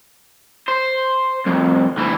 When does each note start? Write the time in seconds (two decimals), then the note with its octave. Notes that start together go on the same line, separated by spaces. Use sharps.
0.68 C5
1.46 C2 F2
1.97 D2 E3